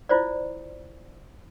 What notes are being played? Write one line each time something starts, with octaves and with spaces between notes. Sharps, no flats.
E4 F4 C5 D5